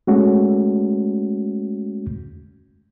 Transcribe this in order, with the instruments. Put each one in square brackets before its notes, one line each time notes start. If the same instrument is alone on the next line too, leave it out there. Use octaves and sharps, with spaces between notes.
[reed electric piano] G#3 A3 C#4 F#4